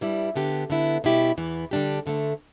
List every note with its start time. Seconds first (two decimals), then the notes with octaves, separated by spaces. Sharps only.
0.01 G2 G3 E4
0.36 D3 B3 G4
0.70 D3 B3 E4
1.04 B2 G3 E4 G4
1.37 E2 E3 B3
1.71 D3 G3 D4 G4
2.06 D2 D3 A3